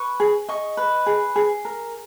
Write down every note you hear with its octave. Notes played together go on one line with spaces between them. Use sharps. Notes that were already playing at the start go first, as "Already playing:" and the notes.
Already playing: B4 C#6
G#4
D#5 C#6
B4
G#4
G#4
A#4